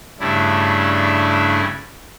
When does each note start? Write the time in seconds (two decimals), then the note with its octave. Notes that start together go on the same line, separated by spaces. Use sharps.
0.20 G2 C#3 A3 D4 E4